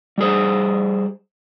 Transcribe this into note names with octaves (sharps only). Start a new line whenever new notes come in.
G3 G4 G#4 C5